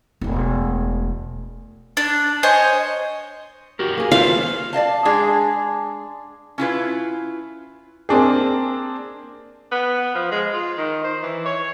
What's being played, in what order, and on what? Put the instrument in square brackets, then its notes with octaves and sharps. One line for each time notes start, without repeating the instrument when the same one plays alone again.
[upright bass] E1 A3
[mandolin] D4
C5 C#5 D#5 G#5
[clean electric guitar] F#4 G4 A#4
[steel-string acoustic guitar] A#3 G#4
[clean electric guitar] F4 B4 C5 [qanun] F5
[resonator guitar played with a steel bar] D5 D#5 F5 A5
G#3 D4 G#4
C#4 E4 F4 B4
[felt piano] A#3 C4 D4 G#4
[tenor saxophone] B3
F3
G#3
F4
D#3
C5
E3
C#5